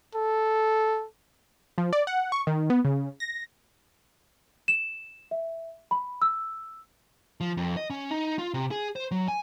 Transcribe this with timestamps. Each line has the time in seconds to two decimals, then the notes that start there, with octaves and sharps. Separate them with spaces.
0.15 A4
1.78 F3
1.93 D5
2.07 F#5
2.32 C#6
2.47 D#3
2.70 B3
2.85 C#3
3.20 A#6
4.68 E7
5.31 E5
5.91 B5
6.22 E6
7.41 F3
7.57 F2
7.77 D#5
7.90 C#4
8.11 D#4
8.39 F4
8.54 C3
8.71 G#4
8.96 C5
9.11 F#3
9.28 G#5